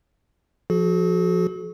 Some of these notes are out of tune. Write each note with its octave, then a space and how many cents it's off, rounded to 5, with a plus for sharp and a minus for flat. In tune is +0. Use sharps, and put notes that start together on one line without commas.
F3 +0 F#4 +0 A4 -45